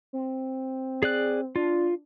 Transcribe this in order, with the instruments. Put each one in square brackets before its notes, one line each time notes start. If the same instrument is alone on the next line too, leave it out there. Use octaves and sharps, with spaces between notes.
[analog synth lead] C4
[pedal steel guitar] G#4 D5 F#6
[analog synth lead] D4 [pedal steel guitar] F4